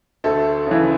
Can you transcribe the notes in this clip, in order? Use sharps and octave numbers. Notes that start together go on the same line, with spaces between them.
D2 A3 A4
C#3 E3